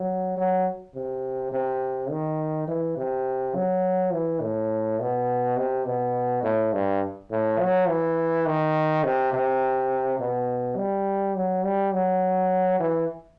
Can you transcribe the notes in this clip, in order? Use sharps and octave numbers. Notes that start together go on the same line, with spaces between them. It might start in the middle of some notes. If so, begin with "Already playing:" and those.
Already playing: F#3
F#3
C3
C3
D#3
E3
C3
F#3
E3
A2
B2
C3
B2
A2
G2
A2
F#3
E3
D#3
C3
C3
B2
G3
F#3
G3
F#3
E3